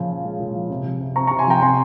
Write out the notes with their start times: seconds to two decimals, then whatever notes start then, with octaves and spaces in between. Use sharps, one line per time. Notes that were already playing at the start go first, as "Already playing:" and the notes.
Already playing: A#2 C#3 F3
0.09 C#4
0.24 G#3
0.39 A#2
0.55 F3
0.70 C3
0.85 F3
1.00 C3
1.16 C4 A#5 C#6
1.27 C3 A#5 C#6
1.38 G#5 C6
1.47 F3 G5 A#5
1.62 C3 G#5 C6